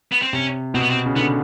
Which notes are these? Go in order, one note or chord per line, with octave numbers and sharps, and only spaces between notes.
B3
C4
C3 C#4
B2 C4
B3
C4
C#3
D3 B3